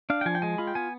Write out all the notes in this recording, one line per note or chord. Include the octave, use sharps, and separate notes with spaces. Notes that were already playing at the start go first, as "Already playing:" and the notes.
D4 F5
G5
F3 G#5
G5
G#3 G#5
F4 B5
G5
B3 G#5